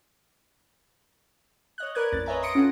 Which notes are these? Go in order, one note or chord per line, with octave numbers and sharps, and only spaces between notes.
C#5 D#5 F#6
A#4 B4 D5 F#6 G#6
A1 F2 A6
B4 C#5 D#5 E5 G#5 A#5
C6 D#6 A#6 C#7 D7
C#4 F4 A4 F#5